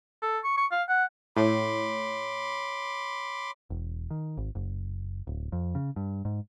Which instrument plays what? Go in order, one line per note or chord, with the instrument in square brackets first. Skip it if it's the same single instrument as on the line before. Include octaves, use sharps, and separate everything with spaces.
[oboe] A4
C#6
C#6
F5
F#5
[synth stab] A2 [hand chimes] C#5 [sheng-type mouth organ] B5 C6 D6
[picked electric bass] E1
D#3
G#1
F#1
D1
F2
C#3
G2
G#2